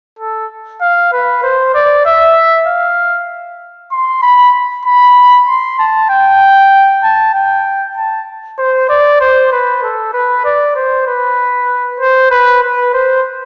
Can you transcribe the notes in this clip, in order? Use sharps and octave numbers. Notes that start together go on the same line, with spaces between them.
A4
F5
B4
C5
D5
E5
F5
C6
B5
B5
C6
A5
G5
A5
G5
A5
C5
D5
C5
B4
A4
B4
D5
C5
B4
C5
B4
B4
C5